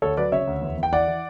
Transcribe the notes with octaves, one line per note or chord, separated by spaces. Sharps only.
D2 A4 C#5
F#3 B4 D5
C#3 C#5 E5
D2
E2
E2
G5
E3 D5 F#5
E3